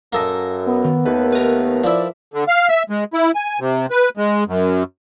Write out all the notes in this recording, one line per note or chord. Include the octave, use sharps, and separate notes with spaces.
F#2 A#3 A4 D#5
B3
D#3
D#2 A3 B4
A#4 B4
F3 E4 D5
D3
F5
E5
G#3
E4
G#5
C3
B4
G#3
F#2